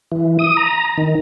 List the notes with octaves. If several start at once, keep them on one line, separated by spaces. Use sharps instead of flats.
E3
D#6
A#5
D#3